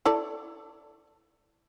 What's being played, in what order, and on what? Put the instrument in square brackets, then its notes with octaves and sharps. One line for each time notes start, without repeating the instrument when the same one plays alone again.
[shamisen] E4 A4 D5